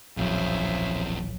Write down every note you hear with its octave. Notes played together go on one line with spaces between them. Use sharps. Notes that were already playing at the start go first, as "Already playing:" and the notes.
D1 A#1 F2 C#3 E3 F#3 C5 E5